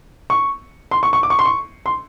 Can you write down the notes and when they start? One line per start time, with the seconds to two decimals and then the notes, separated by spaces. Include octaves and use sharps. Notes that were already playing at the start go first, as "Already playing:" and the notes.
0.30 C#6
0.91 C6
1.03 C#6
1.13 C#6
1.23 D6
1.30 C#6
1.39 C6
1.46 C#6
1.86 C6